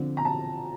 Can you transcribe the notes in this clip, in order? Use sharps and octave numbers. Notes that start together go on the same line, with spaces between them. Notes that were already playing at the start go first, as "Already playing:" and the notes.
Already playing: D3 F3 C4
A#5
A5